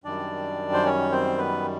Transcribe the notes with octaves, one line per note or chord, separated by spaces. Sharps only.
F#2 D#3 G3 D4 D5
C5
C#4 C#5
C4 C5
B3 B4